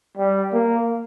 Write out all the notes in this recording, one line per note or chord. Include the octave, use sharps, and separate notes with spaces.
G3
A#3